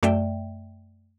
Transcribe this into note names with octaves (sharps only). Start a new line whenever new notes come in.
F#2 A3 D5 E5 G5